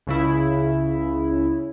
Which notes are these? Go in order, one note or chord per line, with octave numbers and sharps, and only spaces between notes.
C#2 C#3 E4